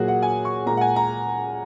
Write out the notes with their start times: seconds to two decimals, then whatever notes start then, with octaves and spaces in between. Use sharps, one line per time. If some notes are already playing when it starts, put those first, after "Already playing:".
Already playing: A#2 F#3 A#3 F#4 G#4
0.08 F#5
0.22 G#5
0.45 C#6
0.66 A#2 G#3 A#5
0.77 F#5
0.81 G#5
0.96 A#5